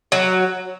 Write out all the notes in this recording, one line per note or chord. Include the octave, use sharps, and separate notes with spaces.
F#3